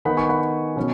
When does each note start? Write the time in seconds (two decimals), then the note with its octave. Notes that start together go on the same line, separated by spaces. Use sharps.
0.05 D#3 B3 D#4 F#5 B5
0.17 G#5 C#6
0.29 F#5 B5
0.76 B2 F#3 C#4